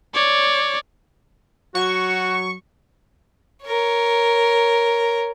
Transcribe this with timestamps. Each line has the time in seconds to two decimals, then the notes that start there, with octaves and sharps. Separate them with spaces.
0.14 C#5 D5
1.75 F#3 F#4 C#6
3.64 A#4 C#5